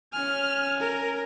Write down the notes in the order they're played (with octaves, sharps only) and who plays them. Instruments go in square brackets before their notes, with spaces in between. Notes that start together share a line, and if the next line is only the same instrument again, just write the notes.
[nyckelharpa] C#4 G#5 [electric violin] F6
[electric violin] A#4